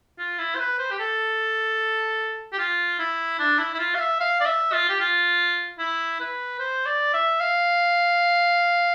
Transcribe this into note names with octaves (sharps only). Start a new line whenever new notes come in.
F4
E4
C5
B4
C5
G4
A4
G4
F4
E4
D4
E4
E4
F4
F5
E5
F5
D5
E5
F4
G4
F4
E4
B4
C5
D5
E5
F5